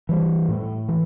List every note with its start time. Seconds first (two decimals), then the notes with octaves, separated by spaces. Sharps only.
0.09 E3 G3
0.49 A2
0.89 E3